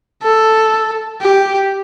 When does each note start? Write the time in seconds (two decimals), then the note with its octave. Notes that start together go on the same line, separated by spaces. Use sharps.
0.23 A4
1.22 G4